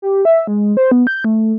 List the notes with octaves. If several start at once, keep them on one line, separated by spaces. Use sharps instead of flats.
G4
E5
G#3
C5
B3
G6
A3